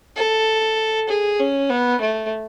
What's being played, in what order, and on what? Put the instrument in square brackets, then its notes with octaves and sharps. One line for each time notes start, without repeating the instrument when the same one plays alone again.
[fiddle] A4
G#4
C#4
B3
A3